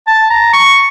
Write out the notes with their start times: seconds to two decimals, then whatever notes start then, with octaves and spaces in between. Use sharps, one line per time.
0.07 A5
0.30 A#5
0.53 C#6